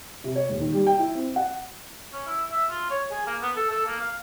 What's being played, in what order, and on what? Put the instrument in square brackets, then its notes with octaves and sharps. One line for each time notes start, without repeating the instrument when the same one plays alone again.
[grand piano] C3
C#5
D#1
D#3
G3
G5
E4
C4
F#5
[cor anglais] C#4
E4
E5
F4
C#5
G#4
A#3
B3
A4
A4
A#3
F5